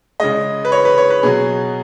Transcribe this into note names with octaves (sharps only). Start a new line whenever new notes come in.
C#3 G#3 D#5
B4
C#5
B4
C#5
B4
B2 F#3 G#4